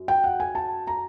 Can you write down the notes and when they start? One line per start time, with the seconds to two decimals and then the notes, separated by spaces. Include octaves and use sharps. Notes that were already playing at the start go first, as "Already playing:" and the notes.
Already playing: F#2
0.08 G5
0.24 F#5
0.40 G#5
0.55 A5
0.87 A#5